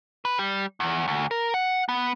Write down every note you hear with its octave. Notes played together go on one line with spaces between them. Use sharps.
B4
G3
E2
D2
A#4
F#5
B3